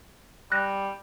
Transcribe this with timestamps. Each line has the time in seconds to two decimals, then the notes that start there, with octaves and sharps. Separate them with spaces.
0.52 G3 F#6 A#6